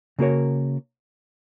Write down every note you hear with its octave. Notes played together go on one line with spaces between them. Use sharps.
C#3 A#3 F#4 A#4 C#5